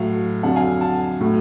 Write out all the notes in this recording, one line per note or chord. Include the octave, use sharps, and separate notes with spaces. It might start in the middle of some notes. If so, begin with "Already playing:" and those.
Already playing: A2 F#3 F5
F2 D3 F#3 F#5 A5
F5 G#5
F#5 A5
A2 F#3